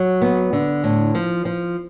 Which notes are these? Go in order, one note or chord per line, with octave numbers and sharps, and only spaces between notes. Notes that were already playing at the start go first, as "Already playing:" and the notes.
Already playing: F#3
B3
D3
A2
F3
F3